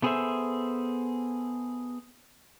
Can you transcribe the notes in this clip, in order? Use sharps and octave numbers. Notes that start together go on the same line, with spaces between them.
A3 B3 G#4 A4 C5 E5